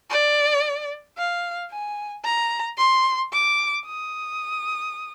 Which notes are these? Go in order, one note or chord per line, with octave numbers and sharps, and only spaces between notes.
D5
F5
G#5
A#5
C6
D6
D#6